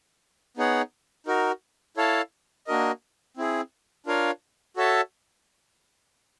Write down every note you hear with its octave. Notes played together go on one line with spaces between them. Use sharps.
B3 D#4 G#4 C#5 F#5
D#4 F#4 A#4
E4 A4 C#5 F5 A5
A#3 D4 F#4 A#4 D#5
C4 E4 G#4
D4 F4 A#4 C#5 F5
F#4 A4 C#5 E5 A5